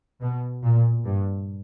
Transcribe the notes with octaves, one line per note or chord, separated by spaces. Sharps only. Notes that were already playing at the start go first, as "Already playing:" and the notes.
B2
A#2
G2